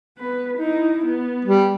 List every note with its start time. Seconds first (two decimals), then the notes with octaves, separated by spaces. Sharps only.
0.18 B3 B4
0.57 D#4 E4
1.05 B3
1.45 G3